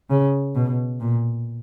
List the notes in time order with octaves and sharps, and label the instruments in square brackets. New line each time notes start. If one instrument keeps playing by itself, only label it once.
[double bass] C#3
B2
A#2